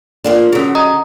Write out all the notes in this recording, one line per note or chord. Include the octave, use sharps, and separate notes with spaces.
F3 A#3 D4
D3 F#3 C#4 G#4
D#5 A#5 D#6